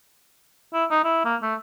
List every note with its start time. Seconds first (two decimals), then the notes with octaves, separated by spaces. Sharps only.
0.73 E4
0.91 D#4
1.04 E4
1.25 A#3
1.42 A3